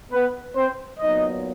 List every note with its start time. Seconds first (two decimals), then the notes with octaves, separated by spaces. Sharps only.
0.12 B3 B4
0.55 C4 C5
0.99 A#2 F#3 B3 D#4 D#5